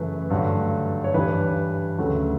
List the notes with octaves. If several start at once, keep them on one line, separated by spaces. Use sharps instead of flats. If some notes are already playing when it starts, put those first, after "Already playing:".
Already playing: F#2 C#3 E3 A3 B4
G2 D3 F#3 A3
C#5
G2 E3 G3 B4
D2 C#3 F#3 A3